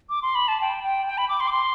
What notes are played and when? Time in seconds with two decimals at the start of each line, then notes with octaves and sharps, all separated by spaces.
0.09 D6
0.22 C6
0.35 B5
0.48 A5
0.61 G5
0.83 G5
1.07 G5
1.18 B5
1.29 D6
1.40 C6
1.47 D6
1.52 C6